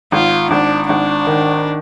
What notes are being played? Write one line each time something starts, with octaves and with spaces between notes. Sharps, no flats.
G#1 F4
G#1 D4
G#1 D4
D#3